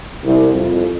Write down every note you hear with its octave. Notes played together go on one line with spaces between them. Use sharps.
C2
F2